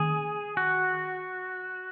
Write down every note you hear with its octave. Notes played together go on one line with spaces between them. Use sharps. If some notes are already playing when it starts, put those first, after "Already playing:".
Already playing: D#3 A#3 C#4 G#4
F#4